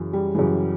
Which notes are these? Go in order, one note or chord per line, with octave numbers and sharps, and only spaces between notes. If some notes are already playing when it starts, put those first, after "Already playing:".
Already playing: F#2 C#3 E3
G3
F#2 C#3 E3